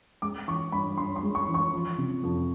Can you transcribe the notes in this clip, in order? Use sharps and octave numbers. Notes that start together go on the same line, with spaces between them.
G#3 D6
E3 C#6
G2 B5
G2 C6
C6
G#3
C#6
E3
C#6
F3
C3
F2